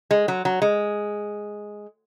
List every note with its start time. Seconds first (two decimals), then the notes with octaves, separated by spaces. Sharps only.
0.11 G#3
0.28 F#3
0.45 F#3
0.62 G#3